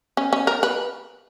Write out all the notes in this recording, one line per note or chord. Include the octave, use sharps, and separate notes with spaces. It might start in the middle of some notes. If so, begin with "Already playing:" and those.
C#4
C#4
A#4
B4